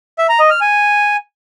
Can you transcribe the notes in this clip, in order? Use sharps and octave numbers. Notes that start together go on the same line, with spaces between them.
E5
A#5
D#5
F6
G#5